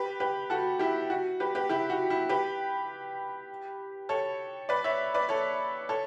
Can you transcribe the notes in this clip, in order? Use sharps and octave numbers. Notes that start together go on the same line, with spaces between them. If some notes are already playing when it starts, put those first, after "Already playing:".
Already playing: G4 B4
G4 B4
F#4 A4
E4 G4
F#4
G4 B4
G4 B4
E4 G4
F#4
E4
G4 B4
A4 C#5
B4 D5
C#5 E5
B4 D5
A4 C#5
A4 C#5